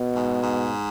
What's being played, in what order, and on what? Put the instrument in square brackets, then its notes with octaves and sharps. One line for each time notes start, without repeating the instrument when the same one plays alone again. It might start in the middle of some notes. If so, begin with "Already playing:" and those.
Already playing: [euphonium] B2
[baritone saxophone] G#2
G#2